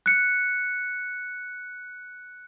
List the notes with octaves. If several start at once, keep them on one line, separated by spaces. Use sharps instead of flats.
F#6 C#7